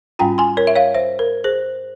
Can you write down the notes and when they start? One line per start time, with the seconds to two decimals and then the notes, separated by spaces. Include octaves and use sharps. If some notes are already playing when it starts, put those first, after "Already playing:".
0.19 G#2 G3 C#4 F4 G5 A#5
0.38 G#5 C6
0.57 A#4 C#5
0.67 E5
0.75 C#5 F5
0.94 C5 E5
1.19 A#4
1.44 G#4 C5